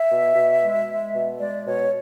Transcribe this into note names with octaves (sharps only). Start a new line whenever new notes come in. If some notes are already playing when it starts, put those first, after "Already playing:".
Already playing: E5
B2
B2
G#3
G#3
B2
G#3 D5
B2 C#5